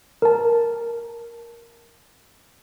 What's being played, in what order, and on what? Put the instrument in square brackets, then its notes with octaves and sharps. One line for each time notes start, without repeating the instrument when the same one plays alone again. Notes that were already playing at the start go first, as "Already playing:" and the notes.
[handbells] A#4 A5